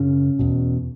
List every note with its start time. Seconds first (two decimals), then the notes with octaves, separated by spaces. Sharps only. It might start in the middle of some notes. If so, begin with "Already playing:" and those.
Already playing: F#2 C#3 C#4
0.39 E2 B2